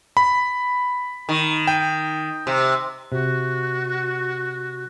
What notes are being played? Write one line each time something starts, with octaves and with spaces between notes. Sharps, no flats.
B5
D#3
G5
C3
C3 F#4 F#6